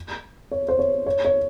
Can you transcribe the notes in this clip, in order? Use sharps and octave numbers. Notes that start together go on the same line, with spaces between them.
C#5
C5
C#5
C#5
C#5